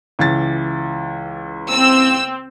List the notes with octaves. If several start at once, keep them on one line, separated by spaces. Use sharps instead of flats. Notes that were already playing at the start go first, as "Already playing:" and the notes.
C#2 E3 A6
C4 E6